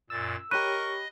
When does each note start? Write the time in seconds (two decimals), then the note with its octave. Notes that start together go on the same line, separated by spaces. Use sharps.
0.10 F#2 A#2 E6 A6
0.51 G4 A#4 C#5 D#5 B5 C#6 F#6 D#7